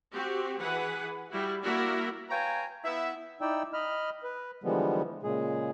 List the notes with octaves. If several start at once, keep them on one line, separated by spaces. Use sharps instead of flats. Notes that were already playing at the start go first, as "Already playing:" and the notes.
C4 F#4 G4
E3 G#4 B4 F#5
G3 E4 F#4
A#3 E4 F#4 A#4 D5 E5
B4 C#5 F5 G5 G#5 A#5
B3 E4 E5
D#4 E4 D5 G5 E6
D#5 B5 F6
B4
D3 E3 F3 G3 G#3 B3
A#2 C#3 G#3 G#4